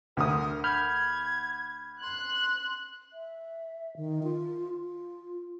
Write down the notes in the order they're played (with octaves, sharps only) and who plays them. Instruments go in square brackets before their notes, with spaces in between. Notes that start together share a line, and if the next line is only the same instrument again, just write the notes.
[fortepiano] D2 D#6 [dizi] A#4
[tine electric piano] B5 F6 G6 [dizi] G#6
[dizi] C6 [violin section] F#6
[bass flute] E5
D#3
F4
F4